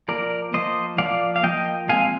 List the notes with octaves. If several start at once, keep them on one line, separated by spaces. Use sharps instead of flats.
F3 A#3 A#4 D5
F3 A#3 C5 D#5
F3 A#3 D5 F5
F5
F3 A#3 D#5 G5
F3 G#3 C4 F5 G#5